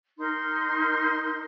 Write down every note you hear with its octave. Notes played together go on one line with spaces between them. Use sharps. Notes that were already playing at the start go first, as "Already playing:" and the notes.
D#4 A#4 C6